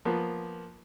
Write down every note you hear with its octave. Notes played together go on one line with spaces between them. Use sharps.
F3 A#3 B3 F4